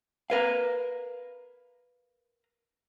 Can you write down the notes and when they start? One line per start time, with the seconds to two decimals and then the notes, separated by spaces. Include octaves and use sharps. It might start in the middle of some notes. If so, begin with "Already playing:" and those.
0.30 A#4 B4 F5